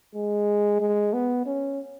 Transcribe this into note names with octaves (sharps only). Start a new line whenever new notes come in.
G#3
G#3
B3
C#4